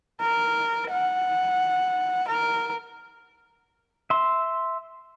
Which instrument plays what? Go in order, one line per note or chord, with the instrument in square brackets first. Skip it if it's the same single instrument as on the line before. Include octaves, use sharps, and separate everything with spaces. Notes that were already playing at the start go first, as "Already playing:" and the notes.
[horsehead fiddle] A#4
F#5
A#4
[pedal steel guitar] E5 C6